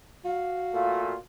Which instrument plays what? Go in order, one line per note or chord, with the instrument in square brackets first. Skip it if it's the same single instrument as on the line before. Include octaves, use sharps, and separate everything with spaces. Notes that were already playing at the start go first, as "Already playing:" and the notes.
[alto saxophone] F#4 [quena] F5
[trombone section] A#2 A3 F4